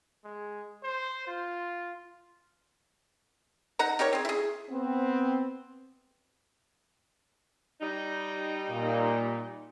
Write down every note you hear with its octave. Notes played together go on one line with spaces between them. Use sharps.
G#3
C5
F4
D#4 F#5 A#5
D#4 G4 A#4 C#5
C4 G#4
E4 G#4
B3 C4
G3 D#4
A#2